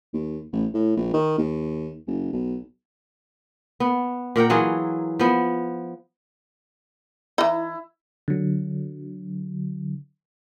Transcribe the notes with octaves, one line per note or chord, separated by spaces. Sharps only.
D#2
A1
A2
A#1
D#3
D#2
F#1
B1
B3
A#2 A#4 F#5 G5
E3 F#3 F4 G#4
F3 B3
E3 D#4 E4
D3 F#3